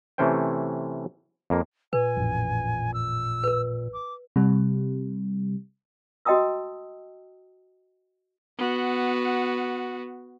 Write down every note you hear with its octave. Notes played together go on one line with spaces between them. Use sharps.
C3 E3 A3 C#4 C5 G5
F2 A#3
A#2 B4 G#5
A1 F2
E6
A#4 B4
D6
C3 G3
F#4 D#5 G5 A5 D#6 E6
B3 F#4